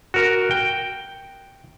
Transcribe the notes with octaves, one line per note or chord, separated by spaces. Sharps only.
F#4 A#4
G5